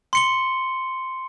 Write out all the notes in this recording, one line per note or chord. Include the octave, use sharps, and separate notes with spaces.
C6 C#7 G7